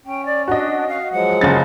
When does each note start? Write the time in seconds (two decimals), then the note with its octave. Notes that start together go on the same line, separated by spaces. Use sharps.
0.06 C#4 G5
0.26 D5
0.48 D4 F#4 D#5
0.88 F5
1.12 F3 F#3 G#3 F#5
1.41 F#1 C#3 A6